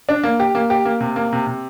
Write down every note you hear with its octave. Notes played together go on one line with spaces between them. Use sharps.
D4
A#3
G4
A#3
G4
A#3
C3
A#3
C3
C3